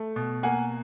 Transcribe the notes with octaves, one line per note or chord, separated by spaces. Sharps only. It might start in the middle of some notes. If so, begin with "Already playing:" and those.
Already playing: A3
B2
A#3 F#5 G#5